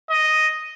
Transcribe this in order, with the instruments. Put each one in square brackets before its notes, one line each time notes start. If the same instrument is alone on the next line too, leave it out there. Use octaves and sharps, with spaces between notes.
[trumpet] D#5